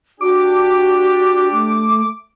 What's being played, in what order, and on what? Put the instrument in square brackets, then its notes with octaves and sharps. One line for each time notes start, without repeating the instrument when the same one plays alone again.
[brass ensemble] D4 G4 [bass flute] F#4 [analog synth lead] D6
[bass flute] A3